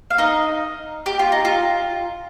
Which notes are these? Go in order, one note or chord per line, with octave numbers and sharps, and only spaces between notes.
F5
D#4 D#5
G4
F4
D#4
F4